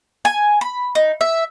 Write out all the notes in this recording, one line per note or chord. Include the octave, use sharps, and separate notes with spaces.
G#5
B5
D#4
E5